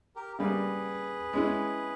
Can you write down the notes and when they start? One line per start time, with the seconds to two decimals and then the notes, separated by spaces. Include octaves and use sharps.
0.16 G4 A#4
0.39 C#3 G3 A#3 G#4 B4
1.33 G#3 C#4 E4